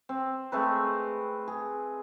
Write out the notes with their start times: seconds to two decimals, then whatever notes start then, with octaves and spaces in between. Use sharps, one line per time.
0.09 C4
0.52 G#3 A3 C4 B4
1.48 G#4